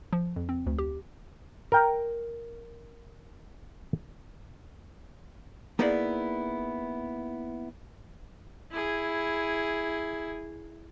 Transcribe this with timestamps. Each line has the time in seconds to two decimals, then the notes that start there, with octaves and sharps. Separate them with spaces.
0.13 F3
0.36 F2
0.49 C4
0.66 D2
0.78 G4
1.72 A#4 G5 A#5
5.79 A#3 B3 D#4 E4 G#4 D5
8.71 E4 G#4